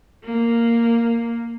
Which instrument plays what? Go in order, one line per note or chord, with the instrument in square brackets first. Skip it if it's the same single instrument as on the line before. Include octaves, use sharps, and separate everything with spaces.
[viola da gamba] A#3